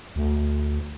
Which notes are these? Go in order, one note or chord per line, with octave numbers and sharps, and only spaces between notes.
D2